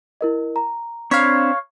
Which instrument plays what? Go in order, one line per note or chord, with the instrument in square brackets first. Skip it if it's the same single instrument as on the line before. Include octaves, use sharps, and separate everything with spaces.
[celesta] E4 A#4 D#5
A#5
[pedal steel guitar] C4 D4 B5 [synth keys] C#5 F5